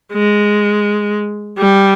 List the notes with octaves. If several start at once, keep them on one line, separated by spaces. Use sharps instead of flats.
G#3
G3